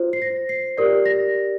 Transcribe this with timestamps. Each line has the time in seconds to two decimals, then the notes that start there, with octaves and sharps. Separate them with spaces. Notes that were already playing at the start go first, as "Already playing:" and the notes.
Already playing: F4 C5
0.13 C7
0.22 A#6
0.49 C7
0.77 G4 A#4 D5 C7
1.06 A#6